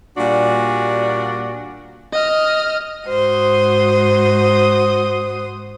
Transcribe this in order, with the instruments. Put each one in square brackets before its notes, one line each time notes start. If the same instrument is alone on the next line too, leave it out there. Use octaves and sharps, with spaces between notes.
[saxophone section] A#2 G3 D4 F#4
[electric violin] D#5 F6
[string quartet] G#2 F#4 C5 D#6